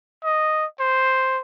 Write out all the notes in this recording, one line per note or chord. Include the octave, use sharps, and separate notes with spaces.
D#5
C5